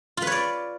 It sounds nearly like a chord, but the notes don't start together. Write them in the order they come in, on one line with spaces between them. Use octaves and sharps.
F4 B4 C#5 D5